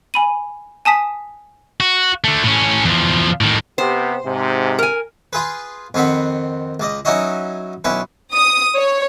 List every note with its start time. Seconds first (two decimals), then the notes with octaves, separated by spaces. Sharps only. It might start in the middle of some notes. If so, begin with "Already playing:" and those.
0.14 G#5 B5 D#7
0.85 G#5 A5 D#6 B6
1.80 F#4
2.24 D3 A3
2.43 A2 C#4
2.85 E2 F3
3.41 A2 D#3
3.78 C3 B3 G4 C5
4.24 G#2 C3
4.79 A#4 G#5
5.33 F4 G#4 B4
5.94 F2 D#3 C4 F#5 B5
6.80 C#2 D5 D#5
7.05 F#3 C#4 D#4 E4 F#4 D#5
7.84 B1 C#4 E4 B4
8.33 D#6
8.76 C#5